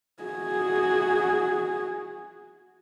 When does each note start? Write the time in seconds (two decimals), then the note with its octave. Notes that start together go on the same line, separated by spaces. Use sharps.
0.23 F#4 G#4